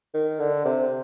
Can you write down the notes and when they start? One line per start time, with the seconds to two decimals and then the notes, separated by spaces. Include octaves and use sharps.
0.14 D#3
0.40 D3
0.65 C3